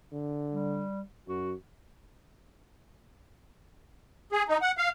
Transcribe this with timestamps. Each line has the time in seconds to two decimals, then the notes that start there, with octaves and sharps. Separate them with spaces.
0.13 D3
0.52 G3
1.28 F#2 F#4
4.32 G#4
4.49 D#4
4.62 F#5
4.78 F5